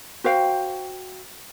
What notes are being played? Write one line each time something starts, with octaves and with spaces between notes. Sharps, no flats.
F#4 C5 F5 G5